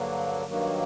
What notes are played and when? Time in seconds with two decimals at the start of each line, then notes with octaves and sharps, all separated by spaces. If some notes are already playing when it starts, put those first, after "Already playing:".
Already playing: G2 D3 F#3 A#3
0.46 G2 D#3 F#3 A#3